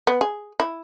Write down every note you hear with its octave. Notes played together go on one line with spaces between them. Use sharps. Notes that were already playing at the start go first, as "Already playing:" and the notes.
B3
G#4
E4